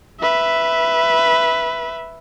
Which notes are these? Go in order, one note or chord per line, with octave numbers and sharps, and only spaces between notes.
B4 E5